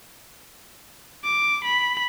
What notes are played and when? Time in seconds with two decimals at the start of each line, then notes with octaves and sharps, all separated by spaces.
1.24 D6
1.65 B5